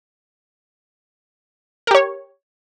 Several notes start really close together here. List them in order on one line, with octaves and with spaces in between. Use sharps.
A#4 G4 C#5